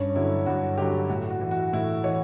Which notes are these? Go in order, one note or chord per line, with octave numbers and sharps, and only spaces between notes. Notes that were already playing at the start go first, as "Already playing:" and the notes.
Already playing: G2 C#4
D3 F#3 E4
G2 F#4
D3 F#3 G4
A2 F#4
F#4
E3
F#4
A2 E4
E3 C#5